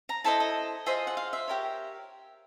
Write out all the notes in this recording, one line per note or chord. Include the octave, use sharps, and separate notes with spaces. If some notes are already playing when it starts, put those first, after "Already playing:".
A#5
E4 A4 C5 D#5 A5
D#5
F4 G#4 C5 D#5 E5
F#5
F5
E5
G4 A#4 C#5